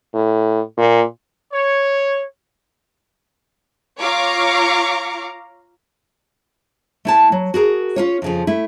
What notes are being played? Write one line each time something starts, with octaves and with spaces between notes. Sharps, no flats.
A2
A#2
C#5
F4 C#5 F5 A#5 C#6 D6
A3 E4 A5
F#3
F#4 G#4 A#4
C#4 F4 C#5
F2 C#3 F3
A3 E4